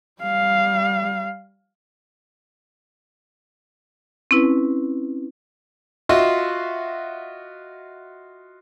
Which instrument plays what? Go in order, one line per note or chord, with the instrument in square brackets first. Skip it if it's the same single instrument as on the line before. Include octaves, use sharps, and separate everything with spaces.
[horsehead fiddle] G3 F5
[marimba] C4 C#4 E4 B4
[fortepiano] F4 F#4 D#5 E5 C6